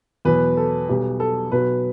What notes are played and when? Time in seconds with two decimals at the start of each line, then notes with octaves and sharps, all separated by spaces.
0.25 E2 B2 F#3 B4
0.57 A4
0.88 B1 B2 G3 G4
1.20 A4
1.52 B1 B2 F#3 B4